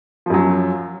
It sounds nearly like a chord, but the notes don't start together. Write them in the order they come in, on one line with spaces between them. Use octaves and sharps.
F3 F#2 F#3